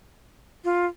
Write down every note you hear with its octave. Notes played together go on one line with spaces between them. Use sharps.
F4